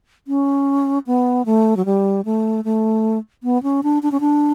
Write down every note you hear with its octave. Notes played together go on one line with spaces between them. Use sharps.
C#4
B3
A3
F#3
G3
A3
A3
B3
C#4
D4
D4
C#4
D4